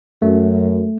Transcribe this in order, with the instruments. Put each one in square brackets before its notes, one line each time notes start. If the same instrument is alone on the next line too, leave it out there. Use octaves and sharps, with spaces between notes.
[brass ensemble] F#2 [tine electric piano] A3